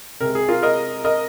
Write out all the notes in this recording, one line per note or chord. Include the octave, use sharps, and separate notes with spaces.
C3 G#3 A#4
G#4
F4 A#4
A#4 D#5
A#4 D#5